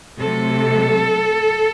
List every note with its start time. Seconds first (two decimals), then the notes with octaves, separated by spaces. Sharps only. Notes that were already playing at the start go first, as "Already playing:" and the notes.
0.18 C3 F#3 A3 A4